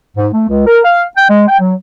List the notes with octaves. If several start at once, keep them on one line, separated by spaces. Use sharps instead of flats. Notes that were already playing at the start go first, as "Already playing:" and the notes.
G#2
A3
C#2
A#4
F5
G5
G#3
G5
F#3